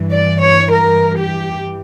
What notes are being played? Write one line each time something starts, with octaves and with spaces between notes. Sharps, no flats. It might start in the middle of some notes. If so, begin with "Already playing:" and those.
Already playing: G2 E3
D5
C#5
A#4
G4